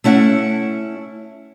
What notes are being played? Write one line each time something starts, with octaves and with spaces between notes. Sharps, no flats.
A3 C#4 E4 F#5